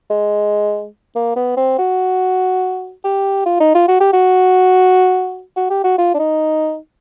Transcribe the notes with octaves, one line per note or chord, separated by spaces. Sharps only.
G#3
A#3
B3
C4
F#4
G4
F4
D#4
F4
F#4
G4
F#4
F#4
G4
F#4
F4
D4
D#4